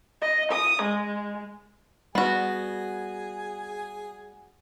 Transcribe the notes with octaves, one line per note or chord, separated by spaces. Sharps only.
D#5
D#6
G#3
G3 B3 F#4 G#4 G#5